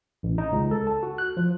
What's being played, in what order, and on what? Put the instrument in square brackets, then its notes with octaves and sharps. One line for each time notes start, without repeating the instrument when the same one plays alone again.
[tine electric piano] A1
D#4
C#2
A4
A5
F#4
F#6
F3